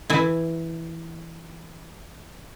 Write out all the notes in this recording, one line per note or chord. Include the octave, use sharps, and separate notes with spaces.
E3 E4